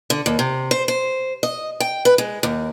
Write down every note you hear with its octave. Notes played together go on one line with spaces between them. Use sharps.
D3
D#2
C3
C5
C5
D#5
G5
B4
G#3
D#2